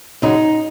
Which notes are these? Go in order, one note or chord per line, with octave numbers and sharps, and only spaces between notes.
F#2 C#3 F#3 D#4